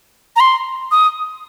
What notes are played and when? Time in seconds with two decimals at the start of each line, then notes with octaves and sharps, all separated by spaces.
0.36 A#5
0.40 C6
0.91 D#6